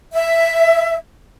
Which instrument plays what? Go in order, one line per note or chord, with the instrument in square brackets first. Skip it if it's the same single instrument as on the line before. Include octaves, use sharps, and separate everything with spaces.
[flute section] E5